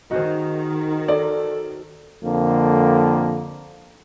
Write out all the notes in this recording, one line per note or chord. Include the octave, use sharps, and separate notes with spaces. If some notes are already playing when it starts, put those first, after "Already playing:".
D#3 D#4 F#4 G#4 C5
A4 D5
F2 D3 A#3